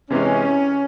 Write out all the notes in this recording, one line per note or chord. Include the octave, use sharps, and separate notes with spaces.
C3 E3 G#3 C#4